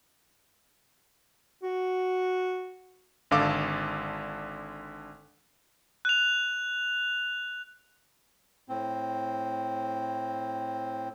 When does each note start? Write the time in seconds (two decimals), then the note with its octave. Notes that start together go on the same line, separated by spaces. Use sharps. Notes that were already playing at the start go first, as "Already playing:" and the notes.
1.63 F#4
3.31 G#1 D3 A4 F5 D6
6.05 F#6 F7
8.69 A2 C4